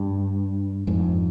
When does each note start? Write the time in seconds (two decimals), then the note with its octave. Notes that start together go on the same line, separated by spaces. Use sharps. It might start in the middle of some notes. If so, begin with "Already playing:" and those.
Already playing: G2
0.87 F2 G#2